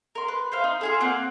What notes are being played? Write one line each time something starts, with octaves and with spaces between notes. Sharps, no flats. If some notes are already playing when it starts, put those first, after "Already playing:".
A#4 C6
B4
C5 E5 F5
D#4
F4 G#4 A4
A#3 C4 F#5